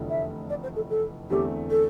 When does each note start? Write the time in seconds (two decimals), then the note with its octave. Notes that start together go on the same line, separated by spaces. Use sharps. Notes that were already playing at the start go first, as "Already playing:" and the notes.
Already playing: F1 E2 D3 F3 A3
0.09 E5
0.49 D5
0.63 C5
0.76 A4
0.90 A4
1.30 E2 D3 A3 C4 G4
1.70 A4